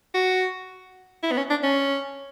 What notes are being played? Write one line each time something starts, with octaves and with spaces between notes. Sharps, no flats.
F#4
E4
B3
C#4
D4
C#4